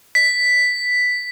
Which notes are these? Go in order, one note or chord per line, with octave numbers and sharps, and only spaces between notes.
B6